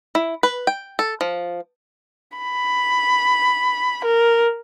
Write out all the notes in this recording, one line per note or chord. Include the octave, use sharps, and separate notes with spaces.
E4
B4
G5
A4
F3
B5
A#4